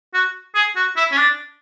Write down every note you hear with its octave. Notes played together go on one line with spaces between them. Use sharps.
F#4
G#4
F#4
E4
C#4
D4